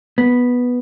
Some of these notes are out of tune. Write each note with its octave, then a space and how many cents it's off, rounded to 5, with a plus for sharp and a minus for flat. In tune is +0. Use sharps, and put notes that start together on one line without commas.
B3 -5